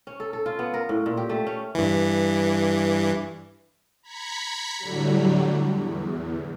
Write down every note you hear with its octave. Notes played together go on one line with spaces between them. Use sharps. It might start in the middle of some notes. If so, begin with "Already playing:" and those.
C#4
A4
A4
F4
B3
A#4
A2
A#2
G4
A3
C#4
G2 E3
A#5 B5 G#6 B6 C#7
A2 D3 F#3 G3
E2